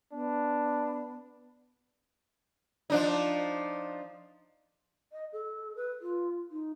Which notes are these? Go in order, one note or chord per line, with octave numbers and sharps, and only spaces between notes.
B3 D4
F3 D4 D#4
D#5
A4
B4
F4
D#4